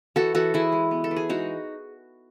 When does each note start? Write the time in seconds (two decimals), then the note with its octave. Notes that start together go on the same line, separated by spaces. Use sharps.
0.16 E3 F#4 A4
0.35 E3 F#4 A4
0.54 E3 E4 G#4
0.72 G#3
0.91 B3
1.04 A4
1.11 E3
1.16 G#4
1.29 G#3 D#4 F#4